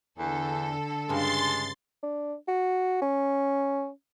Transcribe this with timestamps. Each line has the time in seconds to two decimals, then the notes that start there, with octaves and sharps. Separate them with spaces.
0.19 E2 D3 A4
1.09 G2 C#3 G#3 C6 A6
2.03 D4
2.48 F#4
3.02 C#4